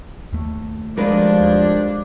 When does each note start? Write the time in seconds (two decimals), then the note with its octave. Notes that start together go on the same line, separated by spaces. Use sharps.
0.33 D#2 A3
0.97 G2 D#3 F3 G#3 D4 A#4 B4